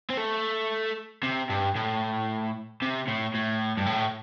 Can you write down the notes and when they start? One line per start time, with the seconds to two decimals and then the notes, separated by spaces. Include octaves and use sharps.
0.10 C4
0.17 A3
1.23 C3
1.50 G2
1.76 A2
2.82 C3
3.07 A2
3.34 A2
3.77 G2
3.86 A2